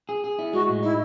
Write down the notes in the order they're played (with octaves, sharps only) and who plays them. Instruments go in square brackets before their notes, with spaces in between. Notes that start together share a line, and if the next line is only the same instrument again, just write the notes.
[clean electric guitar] G#4
G#4
E4
[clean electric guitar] G#3 [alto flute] F#4
[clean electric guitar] A2
[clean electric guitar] D#4 [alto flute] E4